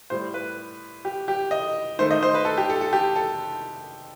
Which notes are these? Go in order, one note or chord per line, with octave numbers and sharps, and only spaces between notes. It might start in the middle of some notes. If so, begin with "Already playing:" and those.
A2 G3 C5
B4
G4
G4
D#5
D#3 A3 C5
D#5
C5
B4
A4
G4
A4
A4
G4
A4